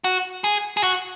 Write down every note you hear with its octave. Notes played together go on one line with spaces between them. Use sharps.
F#4
G#4
G#4
F#4